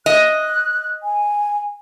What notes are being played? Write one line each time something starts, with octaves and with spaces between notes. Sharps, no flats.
D#5 F#6
G#5